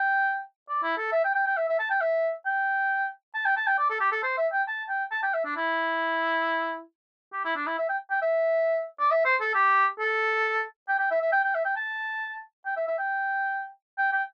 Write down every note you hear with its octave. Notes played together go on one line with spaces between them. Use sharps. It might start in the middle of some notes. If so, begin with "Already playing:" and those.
Already playing: G5
D5
E4
A4
E5
G5
G5
G5
E5
E5
A5
G5
E5
G5
A5
G5
A5
G5
D5
A4
G4
A4
C5
E5
G5
A5
G5
A5
G5
E5
D4
E4
G4
E4
D4
E4
E5
G5
G5
E5
D5
E5
C5
A4
G4
A4
G5
G5
E5
E5
G5
G5
E5
G5
A5
G5
E5
E5
G5
G5
G5